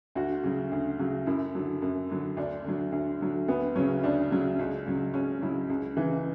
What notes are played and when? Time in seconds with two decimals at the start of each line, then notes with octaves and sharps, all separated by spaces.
0.15 D2 F#4
0.43 C#3 F#3
0.72 D2
0.99 C#3 F#3
1.26 F#2 E4
1.55 D3 F#3
1.82 F#2
2.10 D3 F#3
2.37 D2 D4
2.64 D3 F#3
2.92 D2
3.21 D3 F#3
3.48 D2 B3
3.76 C#3 F#3 C#4
4.03 D2 D4
4.31 C#3 F#3
4.59 C#2
4.86 C#3 F#3
5.14 C#2 C#4
5.42 C#3 F#3 E4
5.70 C#2
5.97 C#3 E3